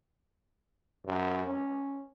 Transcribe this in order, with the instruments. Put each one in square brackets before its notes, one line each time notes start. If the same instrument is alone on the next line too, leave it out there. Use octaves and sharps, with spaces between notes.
[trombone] F#2
C#4